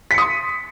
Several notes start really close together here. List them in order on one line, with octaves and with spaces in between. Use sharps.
B6 C#7 D#6 C6